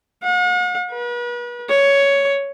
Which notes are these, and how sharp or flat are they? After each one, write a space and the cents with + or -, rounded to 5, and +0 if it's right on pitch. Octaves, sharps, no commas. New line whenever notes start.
F#5 -45
B4 -40
C#5 +10